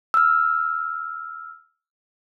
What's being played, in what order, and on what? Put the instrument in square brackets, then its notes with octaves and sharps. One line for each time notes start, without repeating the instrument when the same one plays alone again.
[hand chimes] E6 F6